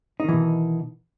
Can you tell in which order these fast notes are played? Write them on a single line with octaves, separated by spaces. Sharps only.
D#4 D#3 E3 B2